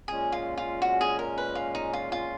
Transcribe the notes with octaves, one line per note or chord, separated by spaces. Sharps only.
A#2 G#3 C#4 G#4
F4
F4
F#4
G#4
A#4
B4
F4
D#4
F4
F4